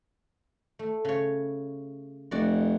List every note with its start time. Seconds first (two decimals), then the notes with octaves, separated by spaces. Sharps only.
0.79 A3
1.05 C#3 C#5
2.31 F1 F#4 D5